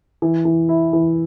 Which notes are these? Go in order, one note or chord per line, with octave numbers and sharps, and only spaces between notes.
E3
E3
E4
E3